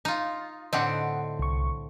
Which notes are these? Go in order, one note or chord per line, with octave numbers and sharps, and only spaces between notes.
D#4 F4
A2 D3 C4 D#5 F#5
C2 C#6